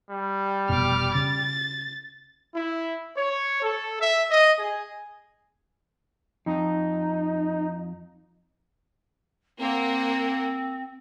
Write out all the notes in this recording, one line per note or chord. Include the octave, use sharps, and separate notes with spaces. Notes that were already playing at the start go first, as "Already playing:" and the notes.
G3
F1 B2 D6 F6
C#3 A6
E4
C#5
A4
E5
D#5
G#4
F2 D#4
A#3 C4 F#5